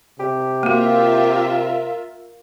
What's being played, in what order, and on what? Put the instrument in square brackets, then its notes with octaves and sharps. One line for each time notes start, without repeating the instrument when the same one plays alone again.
[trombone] C3 [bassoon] G4
[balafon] A#3 F#4 [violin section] F4 A#4 E5